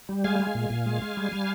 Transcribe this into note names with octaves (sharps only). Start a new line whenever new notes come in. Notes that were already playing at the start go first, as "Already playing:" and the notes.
G3
G#3 F5 G#5
G#3
A#2
A#2
G#3
G#3
G3
G3